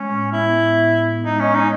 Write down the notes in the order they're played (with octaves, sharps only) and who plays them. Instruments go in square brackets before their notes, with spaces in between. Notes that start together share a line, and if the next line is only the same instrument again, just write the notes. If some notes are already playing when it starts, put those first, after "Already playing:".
Already playing: [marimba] G#3 [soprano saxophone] C#4
[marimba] A2
[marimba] B3 [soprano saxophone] E4
[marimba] A2
A2
B3
[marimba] G#3 [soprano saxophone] D#4
[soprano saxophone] C#4
[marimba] G#3
[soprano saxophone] D#4